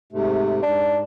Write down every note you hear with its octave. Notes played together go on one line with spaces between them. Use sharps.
G#2 C3 A3
G#2 D4